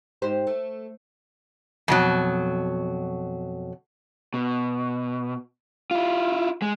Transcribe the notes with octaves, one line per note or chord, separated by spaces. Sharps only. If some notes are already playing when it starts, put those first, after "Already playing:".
G#2 G4 C5
A3
F2 B2 F#3
B2
E4 F4
G#3